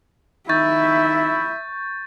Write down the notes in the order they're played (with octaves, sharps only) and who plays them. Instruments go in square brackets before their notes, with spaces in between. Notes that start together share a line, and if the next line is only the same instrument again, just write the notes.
[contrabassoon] D#3 [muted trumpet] E4 [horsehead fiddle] E5 [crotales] C#6 G6 A6